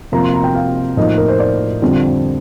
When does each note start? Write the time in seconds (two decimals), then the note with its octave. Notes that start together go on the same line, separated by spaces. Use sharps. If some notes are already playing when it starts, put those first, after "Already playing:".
0.12 C3 F3 A#3 F4 A#5
0.23 C6
0.34 A#5
0.44 G5
0.55 F5
0.97 A2 F3 A#3 D#4 D#5
1.18 A#4
1.28 C5
1.39 D5
1.82 F2 D3 G3 C4 F4